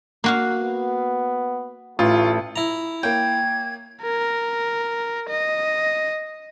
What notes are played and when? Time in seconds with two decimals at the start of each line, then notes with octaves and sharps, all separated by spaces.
0.24 A#3 F#4 F5
0.58 B3
1.99 A1 A3 F4
2.56 E4 A#5
3.03 A#3 C#5 G5 G#6
4.03 A#4
5.30 D#5